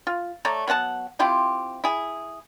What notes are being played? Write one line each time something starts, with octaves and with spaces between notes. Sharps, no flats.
F4
A3 C#5 D5 A#5
F#3 B3 F#5 A5
C4 E4 F4 G4
E4 G#4